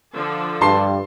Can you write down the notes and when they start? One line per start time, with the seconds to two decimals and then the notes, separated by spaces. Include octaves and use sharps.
0.13 D3 F3 A4
0.61 G2 A5 C6 C7